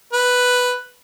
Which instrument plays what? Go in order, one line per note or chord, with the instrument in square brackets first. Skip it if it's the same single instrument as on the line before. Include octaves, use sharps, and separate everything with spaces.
[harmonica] B4